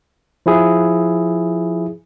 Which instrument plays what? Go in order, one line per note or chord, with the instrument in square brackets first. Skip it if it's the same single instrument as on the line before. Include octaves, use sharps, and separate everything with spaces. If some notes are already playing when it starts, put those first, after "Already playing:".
[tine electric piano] F3 E4 G#4